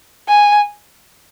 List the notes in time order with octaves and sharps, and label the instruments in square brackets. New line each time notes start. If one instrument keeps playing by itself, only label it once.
[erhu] G#5